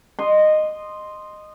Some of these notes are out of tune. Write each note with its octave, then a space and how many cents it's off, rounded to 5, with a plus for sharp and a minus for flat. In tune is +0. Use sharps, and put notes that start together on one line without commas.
D#5 -15 C6 +0